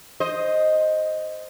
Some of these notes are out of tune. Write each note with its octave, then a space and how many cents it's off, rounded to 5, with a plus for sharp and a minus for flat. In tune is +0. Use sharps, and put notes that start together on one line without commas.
C5 +0 D#5 +0